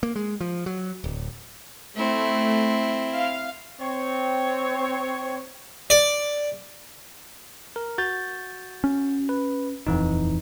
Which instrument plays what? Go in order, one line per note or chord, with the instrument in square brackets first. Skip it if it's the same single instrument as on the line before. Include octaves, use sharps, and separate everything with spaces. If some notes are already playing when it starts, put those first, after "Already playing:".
[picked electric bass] A#3
G#3
F3
F#3
D1
[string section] A3 [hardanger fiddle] C4 E4
[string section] F5
[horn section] C4 C#5
[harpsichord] D5
[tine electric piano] A#4
F#4 G6 A6
[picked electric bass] C#4
[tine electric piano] B4
[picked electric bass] D#1 [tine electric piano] F2 E3 D#4